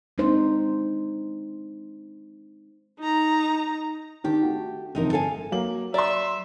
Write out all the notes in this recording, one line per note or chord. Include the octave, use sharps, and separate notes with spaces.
G#3 C4 D4 D#4 C5
D#4 A#5
D#3 D4 G4
A3 F#4
G1 F2 C3 D#4 A#4
A4 F5 G#5
F#3 A#3 F#7
D5 E5 A#5 C6